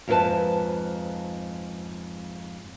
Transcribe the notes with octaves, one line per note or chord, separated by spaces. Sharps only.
F2 G#2 F4 B4 A5